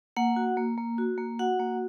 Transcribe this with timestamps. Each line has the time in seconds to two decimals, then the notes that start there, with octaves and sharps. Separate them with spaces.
0.17 A#3 F#5
0.36 F#4
0.57 A#3
0.78 A#3
0.98 F#4
1.18 A#3
1.39 F#4 F#5
1.59 A#3